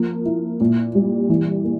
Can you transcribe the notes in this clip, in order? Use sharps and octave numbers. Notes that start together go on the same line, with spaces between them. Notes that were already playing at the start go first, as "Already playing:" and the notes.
Already playing: F3 A#3
E4
A#2
G3
E3
A#3